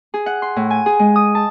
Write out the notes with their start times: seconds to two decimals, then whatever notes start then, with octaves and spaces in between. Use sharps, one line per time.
0.14 G#4
0.26 F#5
0.42 C6
0.56 A2
0.70 G#5
0.86 G#4
0.99 G#3
1.16 D#6
1.35 A5